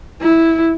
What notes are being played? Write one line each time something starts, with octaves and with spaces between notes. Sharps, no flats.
E4